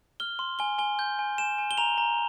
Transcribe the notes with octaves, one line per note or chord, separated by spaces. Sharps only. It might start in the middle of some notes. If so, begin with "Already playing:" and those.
F6 G7
C6
G#5 G7
G#5 G7
G6
G#5
G#5 E7
G#5
G7
A#5 F7
A#5